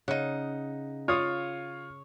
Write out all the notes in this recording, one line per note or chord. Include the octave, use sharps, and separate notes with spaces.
C#3 D#4 F#5
F4 C#5 F5 D#6